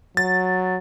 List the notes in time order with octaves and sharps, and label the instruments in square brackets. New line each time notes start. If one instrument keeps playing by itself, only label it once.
[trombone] F#3 [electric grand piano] A6